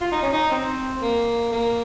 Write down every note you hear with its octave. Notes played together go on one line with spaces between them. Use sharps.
F4
D#4
C#4
D#4
C4
A#3
A#3